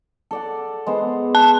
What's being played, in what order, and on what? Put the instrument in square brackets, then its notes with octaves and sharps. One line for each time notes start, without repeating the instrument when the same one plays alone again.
[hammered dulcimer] A4 D5 F#5
G#3 B3 C5
[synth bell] A5